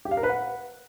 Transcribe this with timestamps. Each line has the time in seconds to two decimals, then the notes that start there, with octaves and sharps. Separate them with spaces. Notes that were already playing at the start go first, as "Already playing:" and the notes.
0.05 G4
0.11 F5
0.17 A#4
0.23 B4
0.29 F#5